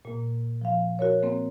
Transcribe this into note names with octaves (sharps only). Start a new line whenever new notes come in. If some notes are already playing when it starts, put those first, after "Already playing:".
A#2 A#3
F3 F5
F#4 A#4 C#5
A#3 C4